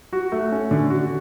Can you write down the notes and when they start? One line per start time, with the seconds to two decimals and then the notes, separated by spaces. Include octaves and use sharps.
0.13 F#4
0.32 A3
0.52 C#4
0.71 D3
0.90 F#4